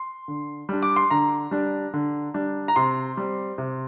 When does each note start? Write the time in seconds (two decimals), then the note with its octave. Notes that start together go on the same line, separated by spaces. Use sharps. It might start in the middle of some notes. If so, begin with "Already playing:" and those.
Already playing: C6
0.28 D3
0.69 G3 D4
0.83 D6
0.96 C6
1.11 D3 A#5
1.51 G3 D4
1.93 D3
2.34 G3 D4
2.68 A#5
2.76 C3 C6
3.17 G3 C4
3.58 C3